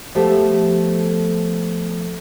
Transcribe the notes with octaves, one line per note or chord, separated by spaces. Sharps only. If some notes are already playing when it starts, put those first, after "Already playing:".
F3 A3 B3 G4 A4 E5